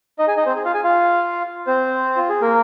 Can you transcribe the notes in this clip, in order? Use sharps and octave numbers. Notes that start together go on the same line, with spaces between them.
D#4 D#5
G#4 G#5
D#4 D#5
C4 C5
G#4
F4 F5
G#4 G#5
F4 F5
C4 C5
F4
G#4
A#3 A#4